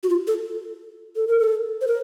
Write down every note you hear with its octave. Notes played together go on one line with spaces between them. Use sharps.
F#4
F4
A4
A4
A#4
A4
C5
A#4